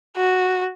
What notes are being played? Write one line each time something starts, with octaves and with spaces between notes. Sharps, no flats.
F#4